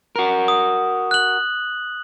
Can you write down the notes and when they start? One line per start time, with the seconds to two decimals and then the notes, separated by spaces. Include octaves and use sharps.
0.16 F#4 A#4
0.48 D#6
1.11 F#6 F#7